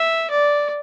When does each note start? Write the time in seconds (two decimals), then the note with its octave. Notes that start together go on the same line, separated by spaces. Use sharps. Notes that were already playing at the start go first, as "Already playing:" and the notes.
Already playing: E5
0.30 D5